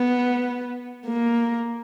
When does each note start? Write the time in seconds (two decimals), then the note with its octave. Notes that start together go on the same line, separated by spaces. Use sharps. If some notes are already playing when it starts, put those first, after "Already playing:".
Already playing: B3
1.07 A#3